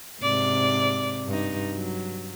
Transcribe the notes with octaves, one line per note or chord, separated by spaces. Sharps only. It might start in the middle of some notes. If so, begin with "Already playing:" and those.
G#2 C3 D5
G2 D#4
F#3